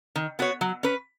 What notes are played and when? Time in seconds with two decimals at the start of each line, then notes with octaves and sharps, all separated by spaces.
0.16 D#3
0.39 B3 F#4 C#5
0.61 F#3
0.83 C#4 B4